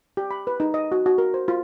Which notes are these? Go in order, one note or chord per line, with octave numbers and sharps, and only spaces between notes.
G4
B5
B4
D#4
D#5
F#4
F#4
A#4
C5
F4